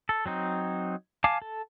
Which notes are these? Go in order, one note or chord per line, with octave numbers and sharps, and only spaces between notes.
A4
F#3 C4 D#4
F5 G#5 A5 D6
A4